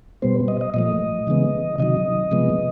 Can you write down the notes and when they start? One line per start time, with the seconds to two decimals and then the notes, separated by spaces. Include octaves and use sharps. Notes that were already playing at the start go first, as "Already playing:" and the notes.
0.22 B2 G3 B3 C5
0.48 D#5
0.61 D#5
0.74 A#2 F3 A3 D#5
1.27 C#3 E3 G#3 B3
1.78 C3 D#3 F#3 D#5
2.31 C3 F3 G#3 B3